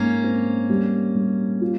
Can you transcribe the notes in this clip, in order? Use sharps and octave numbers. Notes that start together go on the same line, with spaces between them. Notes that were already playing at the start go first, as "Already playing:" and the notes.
Already playing: G#2 A#3 C#4
C4
G3
G3
F4